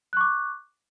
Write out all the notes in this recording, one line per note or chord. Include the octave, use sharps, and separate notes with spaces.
C#6 D6 F#6